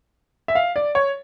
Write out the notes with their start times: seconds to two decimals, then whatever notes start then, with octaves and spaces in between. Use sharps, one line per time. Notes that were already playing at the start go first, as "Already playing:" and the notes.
0.48 E5
0.55 F5
0.76 D5
0.95 C#5